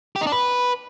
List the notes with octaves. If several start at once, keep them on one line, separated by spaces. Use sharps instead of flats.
G4
D#4
D4
B4